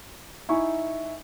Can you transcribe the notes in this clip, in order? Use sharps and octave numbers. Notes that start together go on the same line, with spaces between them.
D#4 E4 G#5 C#6